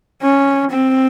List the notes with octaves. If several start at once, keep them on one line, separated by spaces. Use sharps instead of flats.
C#4
C4